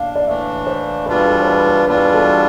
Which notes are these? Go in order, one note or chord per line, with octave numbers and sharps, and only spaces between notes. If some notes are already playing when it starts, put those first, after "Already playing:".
Already playing: D4 F5
D5
A2 E3 A3 D4 E5
C5
E2 B2 G3 D4 F4 B4
A4
C5
B4
B4
E2 B2 G3 D4 F4 B4
A4